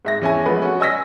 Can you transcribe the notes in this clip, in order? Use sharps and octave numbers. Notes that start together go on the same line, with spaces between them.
G#2 E5 A#6
E2 C#4 E4 G#5
F3 G#3 A3 B3 B4
C#4 F#4
D#5 G#5 E6 A#6 B6